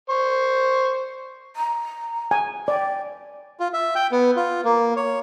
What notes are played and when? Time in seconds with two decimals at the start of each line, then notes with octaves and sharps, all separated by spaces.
0.09 C5 C#6
1.56 A#5
2.31 G#5
2.68 D5 G5
3.60 F4
3.73 E5
3.95 G5
4.11 B3
4.36 F4
4.64 A#3
4.96 C#5